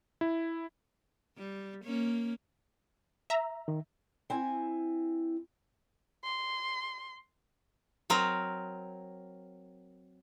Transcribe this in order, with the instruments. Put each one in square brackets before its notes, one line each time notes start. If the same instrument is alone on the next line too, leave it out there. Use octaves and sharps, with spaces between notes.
[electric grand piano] E4
[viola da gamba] G3
A#3 C#4
[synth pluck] E5 A#5
[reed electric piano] D#3
[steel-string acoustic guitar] C4 E4 G#5
[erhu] C6
[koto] F#3 C4 A#4